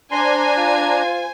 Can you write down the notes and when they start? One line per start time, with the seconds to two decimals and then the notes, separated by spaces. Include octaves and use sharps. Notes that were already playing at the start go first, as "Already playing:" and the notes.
0.12 D4 C5 G#5 A#5 C6
0.57 F4